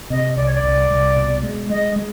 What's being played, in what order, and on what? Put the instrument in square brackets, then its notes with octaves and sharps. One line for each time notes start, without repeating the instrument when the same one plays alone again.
[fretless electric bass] C3 [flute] D#5
[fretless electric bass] C2 [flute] D5
[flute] C#5
D5
[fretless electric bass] C2
C2
B2
G#3
[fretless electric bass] G#3 [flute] D#5
[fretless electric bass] G#3